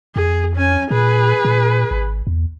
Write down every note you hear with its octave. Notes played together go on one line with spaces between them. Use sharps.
F2 G#4
C#4 G#5
A#2 G#4 B4
A#2
G#1
E2